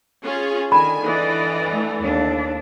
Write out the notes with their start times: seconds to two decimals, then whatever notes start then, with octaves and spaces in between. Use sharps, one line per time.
0.25 C#4 F4 G#4
0.72 D3 D#3 G#5 B5
1.04 E3 D5 D#5
1.72 A3
2.03 D#2 D3 D4